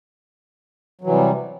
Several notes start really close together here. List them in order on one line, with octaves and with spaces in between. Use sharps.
F#3 E3 C3 G3